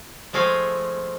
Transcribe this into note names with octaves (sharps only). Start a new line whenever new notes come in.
F3 G#3 A3 C4 F5 G#5